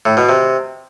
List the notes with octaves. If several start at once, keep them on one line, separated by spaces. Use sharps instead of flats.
A2
B2
C3